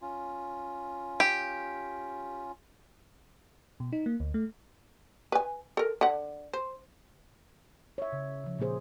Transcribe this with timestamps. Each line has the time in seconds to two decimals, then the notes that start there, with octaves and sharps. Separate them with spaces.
0.02 C#4 F4
1.20 G4
3.80 B2
3.93 D#4
4.06 A#3
4.20 D2
4.34 A3
5.32 B4 G#5
5.77 A4 A#4
6.01 D3 F#5
6.53 C5
7.98 C#5 E5
8.13 C#3
8.44 C#3 F3
8.59 A#2 C#3 A#3 G#4 C5